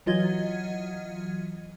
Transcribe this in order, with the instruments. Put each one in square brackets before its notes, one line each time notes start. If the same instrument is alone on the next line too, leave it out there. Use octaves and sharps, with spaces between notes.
[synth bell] E3 F#3 F4 D#5 G#6